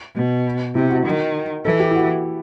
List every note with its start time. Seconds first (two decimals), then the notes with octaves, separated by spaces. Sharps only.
0.15 B2
0.75 C3 E4
0.90 F#4
1.06 D#3
1.65 E3 A4
1.80 G4
1.91 E4
1.96 F#4